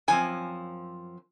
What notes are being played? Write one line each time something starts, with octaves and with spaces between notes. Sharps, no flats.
F#2 F3 C4 G#5